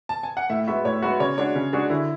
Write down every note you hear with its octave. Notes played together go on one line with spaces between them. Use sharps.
A5
G#5
F#5
A2 E5
G#3 B3 F#4 E5
A2 C#5
G#3 B3 F#4
C#3 C#5
G#3 D4 F#4 C#5
C#3
G#3 D4 F#4 G#4
D3 E4